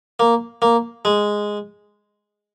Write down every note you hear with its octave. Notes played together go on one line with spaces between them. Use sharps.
A#3
A#3
G#3